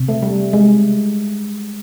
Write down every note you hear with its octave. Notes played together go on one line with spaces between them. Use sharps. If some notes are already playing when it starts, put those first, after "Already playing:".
Already playing: C3
A3
G3
G#3